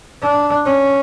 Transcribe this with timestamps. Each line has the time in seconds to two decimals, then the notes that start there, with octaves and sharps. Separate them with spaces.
0.22 D4
0.67 C#4